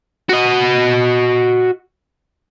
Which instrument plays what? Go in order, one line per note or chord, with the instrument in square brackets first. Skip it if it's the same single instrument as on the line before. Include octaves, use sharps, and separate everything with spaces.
[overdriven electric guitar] F#4 D#5